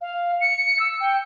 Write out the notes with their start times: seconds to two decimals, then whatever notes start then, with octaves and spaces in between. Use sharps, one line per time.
0.01 F5
0.41 C#7
0.79 E6
1.00 G5